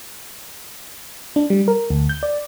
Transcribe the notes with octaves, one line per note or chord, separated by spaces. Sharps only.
D4
G3
A#4
D2
G6
D5